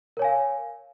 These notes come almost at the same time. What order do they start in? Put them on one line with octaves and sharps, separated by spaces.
A#4 C#5 G#5 F5